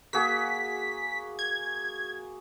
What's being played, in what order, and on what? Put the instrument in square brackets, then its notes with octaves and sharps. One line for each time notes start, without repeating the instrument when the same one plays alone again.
[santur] A#3 F#4 G#4 [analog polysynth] B6
[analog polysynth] G#6